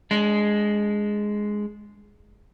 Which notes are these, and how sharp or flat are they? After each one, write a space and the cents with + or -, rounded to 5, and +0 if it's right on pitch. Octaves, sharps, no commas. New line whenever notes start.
G#3 +0 D4 -25